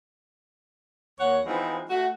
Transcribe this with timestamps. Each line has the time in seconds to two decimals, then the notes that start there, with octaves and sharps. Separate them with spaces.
1.19 D#2 C#5 F#5
1.46 E3 F3 G#3 B3 C4 D#4
1.90 A3 F#4